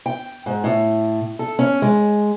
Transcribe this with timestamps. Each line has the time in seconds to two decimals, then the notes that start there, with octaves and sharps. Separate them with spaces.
0.06 G5
0.46 G#2
0.64 A2
1.39 A4
1.59 C#4
1.82 G#3